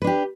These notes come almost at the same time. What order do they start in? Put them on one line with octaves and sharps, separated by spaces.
B4 D4 G4